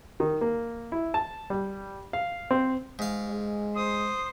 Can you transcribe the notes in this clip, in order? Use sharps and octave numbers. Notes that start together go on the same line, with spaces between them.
D#3
A#3
E4
A5
G3
F5
C4
G#2 F5
G#3
C5 D#6